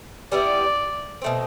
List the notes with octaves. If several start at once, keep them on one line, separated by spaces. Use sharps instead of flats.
G3 B3 E4 D5
B2 A3 C4